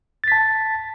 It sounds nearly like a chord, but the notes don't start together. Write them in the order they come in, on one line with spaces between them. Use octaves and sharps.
A6 B6 A5